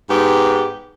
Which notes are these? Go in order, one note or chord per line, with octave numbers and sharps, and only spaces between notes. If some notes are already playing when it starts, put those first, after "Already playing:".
G#2 B3 G4